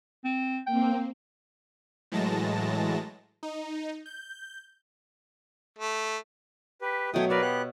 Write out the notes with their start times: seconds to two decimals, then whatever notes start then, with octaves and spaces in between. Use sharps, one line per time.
0.25 C4
0.67 A#3 C4 G5
2.12 A2 E3 F#3 G#3 A5 A#6
3.43 D#4
4.06 G6
5.79 A3
6.81 G4 B4
7.14 B2 F#3 A3 C#5 G5 D#6
7.30 A#4 B4 D5 E5 F5
7.42 B3 G4 F#6